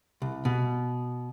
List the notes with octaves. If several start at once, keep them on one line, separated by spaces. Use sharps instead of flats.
C2
B2